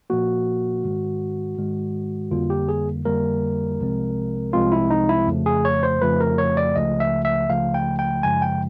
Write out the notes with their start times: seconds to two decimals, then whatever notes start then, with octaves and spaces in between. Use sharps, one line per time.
0.10 A#2 F3 A#3 F#4
0.84 G#2 D#3 G#3
1.58 G#2 D#3 G#3
2.31 F2 D3 G3 A#3 F4
2.50 G4
2.69 G#4
3.05 F2 D3 G3 A#3 A#4
3.80 C2 C3 F3 G#3 C4
4.53 C2 C3 F3 G#3 C4 F4
4.72 E4
4.90 D#4
5.09 E4
5.27 F2 C#3 F3 A3
5.46 G#4
5.65 C#5
5.83 C5
6.02 F2 C#3 F3 A3 B4
6.21 A#4
6.38 C#5
6.57 D5
6.75 C#2 C#3 F3 A3 D#5
7.00 E5
7.25 E5
7.49 C#2 C#3 F3 A3 F5
7.74 G5
7.99 G5
8.23 F#2 C#3 F3 G#3 G#5
8.42 G5